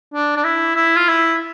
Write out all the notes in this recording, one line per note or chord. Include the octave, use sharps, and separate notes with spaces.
D4
D4
E4
E4
F4
E4